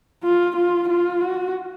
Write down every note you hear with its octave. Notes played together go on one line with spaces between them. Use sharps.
F4
F4
F4
F#4